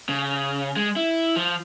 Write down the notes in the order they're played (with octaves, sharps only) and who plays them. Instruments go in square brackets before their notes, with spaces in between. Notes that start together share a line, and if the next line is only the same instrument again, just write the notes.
[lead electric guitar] C#3
G#3
E4
F3